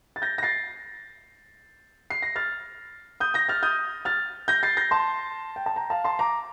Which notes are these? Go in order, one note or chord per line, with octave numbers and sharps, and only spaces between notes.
A6
G6 A#6
A#6
A6 C7
C7
A#6
F6 A6
D#6 G6
G6 A#6
F6 A6
D#6 G6
F6 A6
G6 A#6
A6 C7
G6 A#6
A5 C6
G5
A5
G5 A#5
F5 A5
A5 C6
A#5 D6